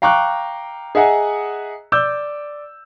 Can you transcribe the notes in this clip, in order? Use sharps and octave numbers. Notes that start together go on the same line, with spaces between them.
F5 G5 A#5 C#6 D6 F#6
G#4 D#5 E5 F#5 G#5 A#5
D5 D6 E6 G6